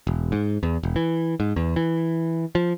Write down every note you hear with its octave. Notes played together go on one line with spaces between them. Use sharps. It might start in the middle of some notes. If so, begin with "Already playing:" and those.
E1
G#2
E2
E1
E3
G#2
E2
E3
F3